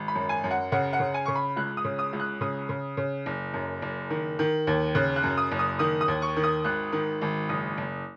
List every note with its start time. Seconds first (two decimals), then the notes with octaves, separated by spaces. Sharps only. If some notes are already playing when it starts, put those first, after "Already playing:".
Already playing: G#1
0.08 B5
0.15 F#2
0.29 G#5
0.44 F#2
0.51 F#5
0.72 C#3 F#5
0.93 F#5
1.00 C#3
1.14 G#5
1.26 C#3 C#6
1.36 B5
1.56 C#2 F#6
1.77 D#6
1.84 C#3
1.99 D#6
2.13 C#2
2.20 F#6
2.41 C#3 D#6
2.69 C#3
2.97 C#3
3.26 F#1
3.54 F#2
3.82 F#1
4.10 D#3
4.39 D#3
4.67 D#2
4.95 C#3 F#6
5.16 F#6
5.24 F#2
5.38 D#6
5.51 F#1
5.59 D#6
5.79 D#3 D#6
6.01 D#6
6.08 D#2
6.22 C#6
6.36 D#3
6.44 D#6
6.64 G#1 F#6
6.93 D#3
7.21 G#1
7.49 F#1 D#6
7.78 F#1